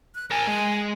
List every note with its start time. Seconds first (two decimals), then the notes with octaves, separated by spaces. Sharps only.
0.15 F#6
0.31 A#4 G#5 A5
0.47 G#3